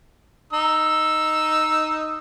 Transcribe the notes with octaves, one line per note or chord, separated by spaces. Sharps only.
D#4 E6